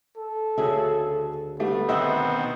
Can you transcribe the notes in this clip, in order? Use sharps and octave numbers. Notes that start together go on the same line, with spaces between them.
A4
D2 C#3 F#4 G#4 E5
G3 A3 B3
B2 D#3 C4 D#5 E5 F#5